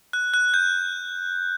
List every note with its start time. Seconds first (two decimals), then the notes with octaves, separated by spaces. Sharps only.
0.13 F#6
0.34 F#6
0.54 G6